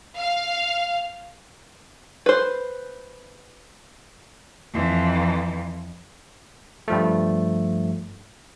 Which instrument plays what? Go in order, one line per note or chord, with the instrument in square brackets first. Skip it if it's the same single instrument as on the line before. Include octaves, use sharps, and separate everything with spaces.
[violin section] F5
[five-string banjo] B4 C5
[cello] F2 E3
[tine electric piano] G2 F3 A3